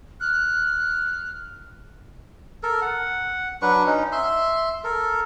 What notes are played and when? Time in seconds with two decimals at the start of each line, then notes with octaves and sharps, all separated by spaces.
0.20 F6 F#6
2.63 A4 A#4
2.82 F#5
3.62 F#3 D4 B4 C#6
3.86 C#4 D#4
4.12 E5 C6
4.84 A4 A#4